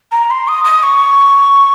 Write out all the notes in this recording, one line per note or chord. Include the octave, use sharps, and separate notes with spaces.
A#5
C6
D#6
D#6
C#6